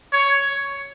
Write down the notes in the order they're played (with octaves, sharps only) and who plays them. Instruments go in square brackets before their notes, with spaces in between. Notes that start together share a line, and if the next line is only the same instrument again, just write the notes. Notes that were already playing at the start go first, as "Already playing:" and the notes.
[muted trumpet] C#5